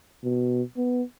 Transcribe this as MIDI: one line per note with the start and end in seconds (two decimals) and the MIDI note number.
0.23 0.62 47
0.76 1.02 59